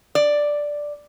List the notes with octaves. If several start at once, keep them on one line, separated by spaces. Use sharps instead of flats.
D5